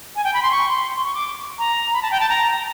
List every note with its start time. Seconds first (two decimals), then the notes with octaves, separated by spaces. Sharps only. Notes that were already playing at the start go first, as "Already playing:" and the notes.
0.16 G#5
0.24 G5
0.34 B5
0.43 C6
0.51 C#6
0.69 C6
0.96 C6
1.04 C#6
1.14 D6
1.58 A#5
1.94 B5
2.02 A5
2.11 G5
2.20 A5
2.29 A#5